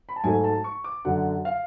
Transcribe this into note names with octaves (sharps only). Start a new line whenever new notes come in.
B5
A5
G#2 F#3 A3 G#5
A5
C#6
D6
F#2 D3 F#3 F#5
F5